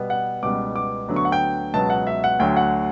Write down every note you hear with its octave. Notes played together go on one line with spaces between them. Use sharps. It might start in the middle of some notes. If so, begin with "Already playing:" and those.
Already playing: B2 G3 B3
F#5
C#2 B2 G3 B3 D6
D6
D2 D3 F#3 B3
C#6
F#5
G5
C#2 B2 F#3 B3 A5
F#5
E5
F#5
D2 D3 F#3 G5
F#5